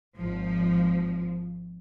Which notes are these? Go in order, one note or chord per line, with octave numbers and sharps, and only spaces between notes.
G#1 F3